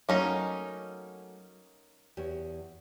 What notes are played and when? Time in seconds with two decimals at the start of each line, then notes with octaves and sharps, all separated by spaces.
0.09 F#3 A3 A#3 C#4 D#4 C#5
2.17 E2 G4 C#5